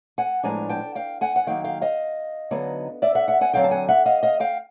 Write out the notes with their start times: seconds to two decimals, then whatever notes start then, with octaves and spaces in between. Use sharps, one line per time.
0.18 F#5 G#5
0.43 A2 F3 G#3 B3 D4 G#5 A#5
0.69 G5 A5
0.95 F5 G5
1.21 F#5 G#5
1.36 F#5
1.47 D#3 F#3 A#3 F5 G5
1.64 F5 G5
1.81 D#5 F5
2.51 D3 F#3 B3 D#4
3.02 D5 E5
3.15 E5 F#5
3.28 E5 F#5
3.41 F#5 G#5
3.53 D3 F#3 A3 C4 F5 G5
3.64 A5
3.71 F#5 G#5
3.88 E5 F#5
4.06 D#5 F5
4.23 D#5 F5
4.40 F5 G5